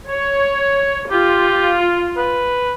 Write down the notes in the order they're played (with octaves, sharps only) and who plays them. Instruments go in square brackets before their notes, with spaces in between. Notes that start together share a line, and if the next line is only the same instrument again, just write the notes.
[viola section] C#5
[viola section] F4 [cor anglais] G4
[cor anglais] B4